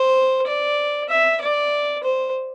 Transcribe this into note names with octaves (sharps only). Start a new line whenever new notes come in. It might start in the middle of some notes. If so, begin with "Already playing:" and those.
Already playing: C5
D5
E5
D5
C5